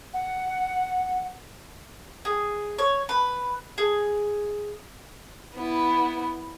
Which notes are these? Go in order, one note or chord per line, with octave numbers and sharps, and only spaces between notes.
F#5
G#4
C#5
B4
G#4
B3 E4